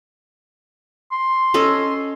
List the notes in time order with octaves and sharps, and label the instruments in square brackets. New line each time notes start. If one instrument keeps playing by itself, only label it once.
[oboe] C6
[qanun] C#4 A4 D#5